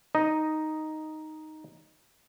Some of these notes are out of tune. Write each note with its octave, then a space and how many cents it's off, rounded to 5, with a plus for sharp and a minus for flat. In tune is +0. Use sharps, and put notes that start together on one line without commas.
D#4 +0 D#5 +0